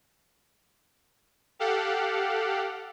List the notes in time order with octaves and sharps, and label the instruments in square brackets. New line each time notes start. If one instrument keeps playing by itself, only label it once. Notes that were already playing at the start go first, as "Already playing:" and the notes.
[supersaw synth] G4 A4 F5 F#5